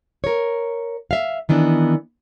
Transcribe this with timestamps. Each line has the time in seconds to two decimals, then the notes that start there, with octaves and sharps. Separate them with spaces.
0.24 A#4 C#5
1.11 E5 F5
1.49 D#3 E3 B3 D4